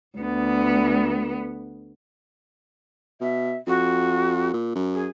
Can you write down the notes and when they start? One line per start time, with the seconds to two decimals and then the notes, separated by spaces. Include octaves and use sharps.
0.18 D2 B3
3.21 B2 E5
3.67 F2 F#4
4.54 A#2
4.75 F#2
4.94 G#4